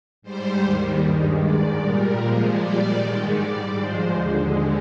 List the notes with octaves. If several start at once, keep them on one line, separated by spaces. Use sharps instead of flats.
G#2 G3 C5
D#2 D#3 G3
G2 D#3 G#3
G#2 D#3 G#3 D5
A#2 G3 A#4
A#2 F3 G#3
A#2 G3 D5
G#2 D#3 G#3
G#2 G3 D5
G#2 F3 G#3 C5
D#2 D3 G#3